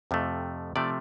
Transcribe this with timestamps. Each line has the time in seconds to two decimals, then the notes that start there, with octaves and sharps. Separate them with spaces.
0.11 F2 C3 F3 A3
0.76 C3 F3 A3 D5